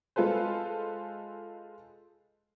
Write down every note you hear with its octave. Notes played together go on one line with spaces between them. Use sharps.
G#3 F4 A4 B4 C5